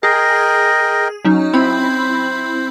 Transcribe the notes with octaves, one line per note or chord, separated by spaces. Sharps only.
G#4 A#4 D#5 G5
F#3 C#4 D#4
C4 E4 C5 B5